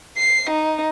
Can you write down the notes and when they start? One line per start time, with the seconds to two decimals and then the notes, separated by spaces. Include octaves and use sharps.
0.17 C7
0.50 D#4